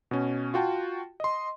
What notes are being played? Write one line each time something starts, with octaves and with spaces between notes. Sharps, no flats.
B2 C#4
F4 F#4 G5 A5
D#5 C6